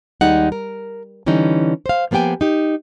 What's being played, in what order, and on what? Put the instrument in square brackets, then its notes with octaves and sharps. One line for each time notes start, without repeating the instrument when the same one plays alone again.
[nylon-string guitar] D#2 G3 G#3 D#4 F#5
A#4
D3 E3 G3 C#4 D#4
C5 F5
F3 A#3 B3 G4 G5 G#5
D#4 G4